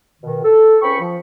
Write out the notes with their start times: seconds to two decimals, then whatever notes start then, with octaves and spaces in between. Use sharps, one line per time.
0.22 B2 D#3
0.44 A4
0.81 C#2 C4 C#4 G5 B5 C#6
1.01 F3